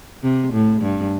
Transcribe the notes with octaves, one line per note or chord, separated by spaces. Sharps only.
C3
A2
G2